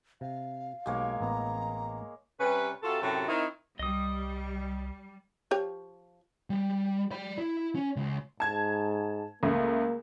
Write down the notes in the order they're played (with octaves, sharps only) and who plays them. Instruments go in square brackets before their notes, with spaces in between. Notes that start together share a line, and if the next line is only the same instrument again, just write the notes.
[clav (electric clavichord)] C3 [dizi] F5
[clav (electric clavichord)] B1 G4 [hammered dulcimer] G#3 A#3 C#5
[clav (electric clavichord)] A1 B3 D#5 [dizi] A#5
[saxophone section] C3 G3 C#4 B4
C3 F4 F#4 A4
F#2 A2 C3 F#4 G4 A4
D#3 C4 D#4 E4
[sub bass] C2 [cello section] G3 [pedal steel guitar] D#5 D#6
[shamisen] F3 G4 C#5
[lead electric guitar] G3
D5 B5
E4
C#4
C#2
[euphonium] G#2 [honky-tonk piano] A5 G#6
[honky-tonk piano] C#2 A3 [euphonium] A#3